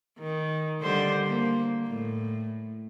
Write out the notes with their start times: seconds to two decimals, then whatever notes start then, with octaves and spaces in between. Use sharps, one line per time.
0.19 D#3
0.81 D3 G3 C5
1.26 A#3
1.87 A2